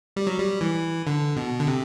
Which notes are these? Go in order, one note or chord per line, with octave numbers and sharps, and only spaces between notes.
G3
F#3
G3
E3
D3
B2
D3
C3